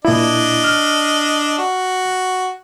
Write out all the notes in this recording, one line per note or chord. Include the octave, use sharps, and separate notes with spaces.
A#2 D4 E4 D#5
F6
F#4